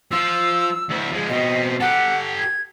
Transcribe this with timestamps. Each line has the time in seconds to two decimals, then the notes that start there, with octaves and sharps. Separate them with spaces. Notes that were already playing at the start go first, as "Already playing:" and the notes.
0.11 F3 F4 E6
0.89 D2 E4
1.10 F3 G#3
1.29 B2 C4 D#5
1.81 G4 A4 F#5
2.38 G#6